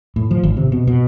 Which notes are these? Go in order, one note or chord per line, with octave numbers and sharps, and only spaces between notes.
A2
F3
G#1
C3
B2
B2